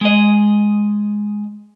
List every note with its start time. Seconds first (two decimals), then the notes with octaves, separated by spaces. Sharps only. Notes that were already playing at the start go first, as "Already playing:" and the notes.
0.01 G#3 D#5